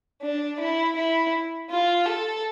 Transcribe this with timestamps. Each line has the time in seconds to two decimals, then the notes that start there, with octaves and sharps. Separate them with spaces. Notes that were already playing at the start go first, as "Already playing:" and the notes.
0.22 D4
0.60 E4
0.96 E4
1.70 F4
2.06 A4